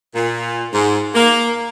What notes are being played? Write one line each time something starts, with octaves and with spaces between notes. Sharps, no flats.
A#2
G#2
A#3